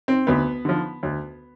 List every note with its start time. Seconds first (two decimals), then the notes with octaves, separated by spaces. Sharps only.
0.08 C4
0.27 D2 B3
0.65 D3 F3
1.03 D2